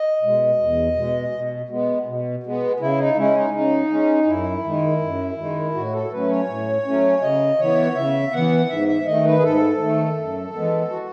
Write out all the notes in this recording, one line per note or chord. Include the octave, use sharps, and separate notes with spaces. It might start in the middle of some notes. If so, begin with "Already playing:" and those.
Already playing: D#5
B2 G#3
E2
B2 G#3
B2
G#3 B3
B2
G#3 B3
C#3 E4
D#4
G#3 C#4 E4
D#4
C#3 D#4
G#3 C#4
F#2 E4
D#3 G#3
F#2
D#3 G#3
A2 F#4
A4
F#3 A3 C#4 B4
C#5
A2
F#3 A3 C#4
C#3 D#5
E3 B3 C#5
C#3 E5
E3 B3 F#5
G#2 E5
E5
D#3 A3 D#5
B4
G#4
G#2 A4
D#3 A3
F#2
E3 G#3 B3
F#4